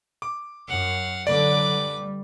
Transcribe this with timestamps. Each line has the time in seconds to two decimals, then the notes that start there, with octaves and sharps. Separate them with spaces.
0.22 D6
0.68 F#2 F5 F#5
1.27 D3 F#3 B4 D5 D6
1.75 G3